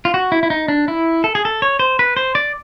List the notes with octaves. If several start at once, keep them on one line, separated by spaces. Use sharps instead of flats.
F4
F#4
E4
E4
D#4
D4
E4
A4
G#4
A4
C#5
C5
B4
C5
D5